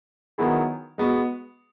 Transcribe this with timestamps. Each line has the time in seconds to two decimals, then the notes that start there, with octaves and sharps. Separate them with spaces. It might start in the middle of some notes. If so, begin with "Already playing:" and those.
0.38 D#3 F#3 B3 E4 G#4
0.98 G#3 B3 F#4